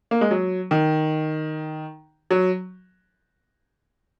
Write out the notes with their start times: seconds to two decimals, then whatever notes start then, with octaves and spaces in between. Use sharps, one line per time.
0.11 A#3
0.21 G#3
0.31 F#3
0.71 D#3
2.31 F#3